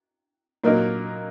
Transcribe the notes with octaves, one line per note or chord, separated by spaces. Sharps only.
A#2 F#3 A#3 D#4 A#4